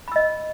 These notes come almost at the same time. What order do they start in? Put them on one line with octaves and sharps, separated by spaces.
B5 E6 D#5